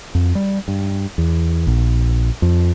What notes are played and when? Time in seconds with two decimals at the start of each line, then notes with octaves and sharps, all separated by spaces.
0.15 F2
0.35 G3
0.68 G2
1.18 E2
1.67 A#1
2.42 F2